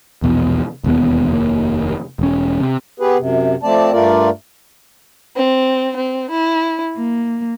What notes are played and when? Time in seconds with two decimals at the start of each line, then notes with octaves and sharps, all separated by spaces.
0.22 A#1 E2 B2
0.84 E1 D#2 B3
1.29 F1 D#2 A#3
2.19 E1 C#4
2.60 C3
3.00 B3 G4 G#4 B4
3.17 F#2 C3
3.63 F3 A3 C4 D5 A5
3.92 G2 A3 F4 A#4 D5
5.35 C4
5.96 C4
6.29 E4
6.97 A#3